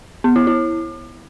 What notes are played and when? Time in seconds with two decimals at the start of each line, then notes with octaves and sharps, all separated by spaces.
0.24 B3
0.36 E4
0.47 E4